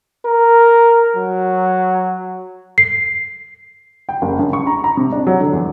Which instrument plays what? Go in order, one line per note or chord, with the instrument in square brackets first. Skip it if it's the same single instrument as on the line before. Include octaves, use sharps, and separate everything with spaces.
[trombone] A#4
F#3
[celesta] C7
[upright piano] G5
F#1
C#3
C#6
A#5
A#5
C3
D4
F#3
D3
E2